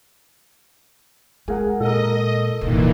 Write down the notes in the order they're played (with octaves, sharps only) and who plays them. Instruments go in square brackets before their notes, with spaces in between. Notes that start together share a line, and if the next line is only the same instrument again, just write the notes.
[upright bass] G#3 [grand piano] G#4 A#4 F#5
[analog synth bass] A#2 [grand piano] A4 A#4 [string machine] D#5
[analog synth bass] D1 [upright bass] C2 G2 [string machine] A#2 D#3 E3